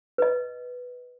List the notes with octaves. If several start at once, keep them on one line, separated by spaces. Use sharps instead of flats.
B4 D#5